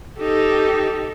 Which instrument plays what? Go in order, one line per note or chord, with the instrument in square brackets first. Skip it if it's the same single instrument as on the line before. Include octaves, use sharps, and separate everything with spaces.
[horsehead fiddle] D#4 G4 [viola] A4